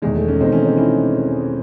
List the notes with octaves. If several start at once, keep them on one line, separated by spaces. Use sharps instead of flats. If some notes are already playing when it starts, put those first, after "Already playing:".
E1 E2 D#3 G#3
A3
A3 C#4
E1 E2 D#3 C4 D#4
A3 C#4
C4 D#4
C#4 E4